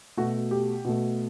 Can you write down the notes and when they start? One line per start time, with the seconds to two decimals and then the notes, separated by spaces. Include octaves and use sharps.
0.17 B2 A3 F#4
0.51 G4
0.85 B2 A3